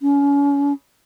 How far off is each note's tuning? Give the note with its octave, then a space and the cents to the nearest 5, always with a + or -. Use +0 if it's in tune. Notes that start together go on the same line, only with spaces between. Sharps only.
C#4 +30